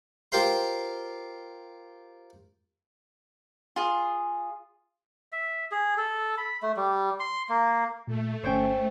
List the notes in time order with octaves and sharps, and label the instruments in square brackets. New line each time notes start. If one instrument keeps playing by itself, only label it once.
[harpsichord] F4 G4 A#4 C5 F5 C6
[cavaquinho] F4 G#4
[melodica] E5
G#4
A4
B5
A3
G3
C6
A#3
[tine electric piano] A#2 [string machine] A3
[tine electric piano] G1 C#4 [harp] C5 C#5 G5